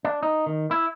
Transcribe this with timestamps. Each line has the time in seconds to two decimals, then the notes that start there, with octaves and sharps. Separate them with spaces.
0.05 D4
0.23 D#4
0.46 D#3
0.71 E4